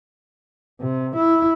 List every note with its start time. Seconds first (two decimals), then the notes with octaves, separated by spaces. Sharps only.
0.81 C3
1.16 E4